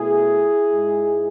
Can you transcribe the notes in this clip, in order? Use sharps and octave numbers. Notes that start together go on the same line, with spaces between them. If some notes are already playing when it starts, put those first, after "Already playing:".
Already playing: B2 A3 E4 G#4
G#2 G#3